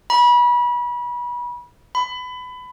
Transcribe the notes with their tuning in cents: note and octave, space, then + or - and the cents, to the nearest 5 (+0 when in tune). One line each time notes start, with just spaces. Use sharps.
B5 -30
B5 +25